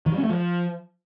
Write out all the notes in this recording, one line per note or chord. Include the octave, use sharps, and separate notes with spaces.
D#3
G3
C#4
A3
F3